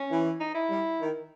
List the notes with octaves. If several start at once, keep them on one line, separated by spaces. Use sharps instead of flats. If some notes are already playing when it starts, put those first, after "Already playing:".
Already playing: C#4
E3
D#4
E4
G3
D#3